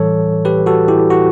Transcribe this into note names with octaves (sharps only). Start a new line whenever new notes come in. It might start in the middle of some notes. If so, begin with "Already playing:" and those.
Already playing: A2 E3 G3 A4 C#5
G4 B4
F#4 A4
E4 G4
F#4